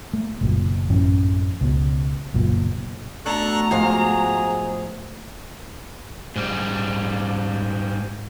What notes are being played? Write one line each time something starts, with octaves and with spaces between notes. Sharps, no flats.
A3
F#1 B1 A#2
A1 F#2 E3 C#4
C#2 B2
F#1 B1 A#2
A3 B3 D4 F#4 A4 A#5 C#6 F#6
G#2 F3 G#4 F5
G#2 G3